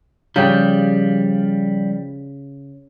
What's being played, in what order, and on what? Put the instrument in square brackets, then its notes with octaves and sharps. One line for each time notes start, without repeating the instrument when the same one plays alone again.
[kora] C#3 G4 [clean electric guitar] F3 G3